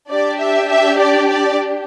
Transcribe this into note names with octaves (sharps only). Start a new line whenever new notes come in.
D4 G4 D5
E5
E5
D5
D5